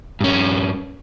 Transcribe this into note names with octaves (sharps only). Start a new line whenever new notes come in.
G2 C#4